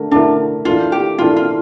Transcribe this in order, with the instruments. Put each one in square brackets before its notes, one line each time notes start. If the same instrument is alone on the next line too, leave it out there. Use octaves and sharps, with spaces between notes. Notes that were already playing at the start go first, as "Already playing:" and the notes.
Already playing: [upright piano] D3 A3 A#4
[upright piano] D3 A3 E4 A#4 [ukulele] D4
[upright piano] E3 A#3 D4 A4 [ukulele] F4
[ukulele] G4
[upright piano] E3 A#3 D4 A4 [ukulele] F4
[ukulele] F4